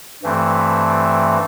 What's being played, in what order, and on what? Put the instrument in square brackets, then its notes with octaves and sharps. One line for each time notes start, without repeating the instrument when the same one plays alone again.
[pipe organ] G2 E3 A3 C4